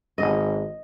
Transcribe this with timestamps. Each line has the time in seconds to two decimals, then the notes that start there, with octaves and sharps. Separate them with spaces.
0.18 G#1 D#5